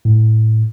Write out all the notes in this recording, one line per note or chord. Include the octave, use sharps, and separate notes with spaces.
A2